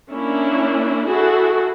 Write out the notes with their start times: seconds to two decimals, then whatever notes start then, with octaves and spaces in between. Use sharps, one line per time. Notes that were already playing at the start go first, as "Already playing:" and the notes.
0.12 A#3 C#4 D4 E4
1.08 E4 F#4 G#4 A4